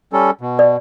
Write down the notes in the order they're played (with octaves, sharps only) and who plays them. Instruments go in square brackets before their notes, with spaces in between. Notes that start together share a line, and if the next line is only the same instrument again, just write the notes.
[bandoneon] G3 C#4 A4
B2
[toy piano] D5